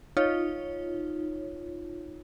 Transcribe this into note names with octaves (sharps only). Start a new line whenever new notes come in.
D#4 F4 C#5